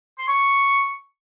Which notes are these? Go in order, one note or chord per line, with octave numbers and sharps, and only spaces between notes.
C6
C#6